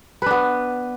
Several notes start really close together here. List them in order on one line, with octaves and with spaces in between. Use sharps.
B4 D4 B3